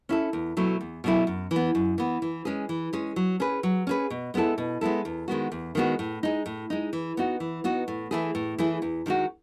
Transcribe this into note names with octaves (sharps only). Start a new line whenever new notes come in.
C#4 E4 A4
E2
B2 F#3 A3 E4
E2
B2 F#3 A3 E4
F#2
E3
B3
F#2
E3 B3
E3
G#3 C#4 G#4
E3
G#3 C#4 G#4
F#3
C#4 G#4 B4
F#3
C#4 G#4 B4
B2
G#3 B3 E4 A4
B2
G#3 B3 E4 A4
E2
D#3 G#3 B3 F#4
E2
D#3 G#3 B3 F#4
A2
G#3 D#4
A2
G#3 D#4
E3
B3 D#4 F#4
E3
B3 D#4 F#4
A2
E3 A3 E4 G#4
A2
E3 A3 E4 G#4
E2
D#3 G#3 D#4 F#4